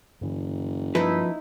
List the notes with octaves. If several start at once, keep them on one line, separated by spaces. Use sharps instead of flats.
F#1 G2 D3 E3
G2 F3 D#4 E4 B4